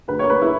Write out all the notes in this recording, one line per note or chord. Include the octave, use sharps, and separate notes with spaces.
D2 B4
C#5
A#3
B4
E4